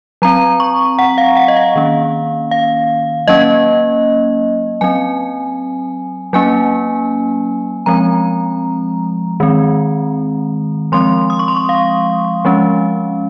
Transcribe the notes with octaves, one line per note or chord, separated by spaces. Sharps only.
F#3 C4 A#5
C#6
F#5
F5
F#5
D#5
F5
D#3 A#3 C#4
F5
F#3 A#3 C#4 D#5
F#3 C4 G#5
F#3 A#3 C#4 G#5
F3 G#3 C4 A#5
D#3 G#3 C4
F3 G#3 C4 C6
D#6
C#6
C6
C#6
F5
F3 G#3 C#4